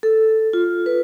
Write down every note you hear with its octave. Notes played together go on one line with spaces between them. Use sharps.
A4
F4
B4